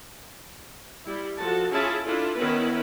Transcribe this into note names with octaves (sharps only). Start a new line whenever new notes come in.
G3 E4
F3 F#4 A4 A5
C#4 E4 F4 G#4 E5 A5
D4 E4 F4 A4
D#3 B3 C#4 E4 A#4 B4